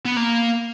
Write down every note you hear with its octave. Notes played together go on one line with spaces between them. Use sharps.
B3
A#3